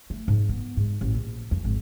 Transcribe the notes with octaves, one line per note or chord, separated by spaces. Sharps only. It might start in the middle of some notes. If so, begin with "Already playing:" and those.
A3
G#2
B3
G#2
A1
A#1
F2
G#1